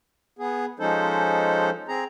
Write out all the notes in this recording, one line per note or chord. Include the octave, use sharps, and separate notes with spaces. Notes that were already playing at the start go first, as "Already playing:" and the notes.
B3 G#4
F3 G#3 C#4 D#4 A4 C5
C4 G#4 A#5